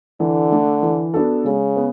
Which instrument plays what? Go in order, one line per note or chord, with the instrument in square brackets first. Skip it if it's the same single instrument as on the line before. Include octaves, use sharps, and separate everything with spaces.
[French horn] D3 [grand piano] E3
[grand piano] A3 D4
E3
B3 D4 F#4 A4
[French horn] C#3 [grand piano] G#3
[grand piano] B3